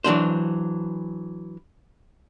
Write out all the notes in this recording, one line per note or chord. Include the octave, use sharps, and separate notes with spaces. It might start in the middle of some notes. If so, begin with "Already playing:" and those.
E3 F#3 D4 C5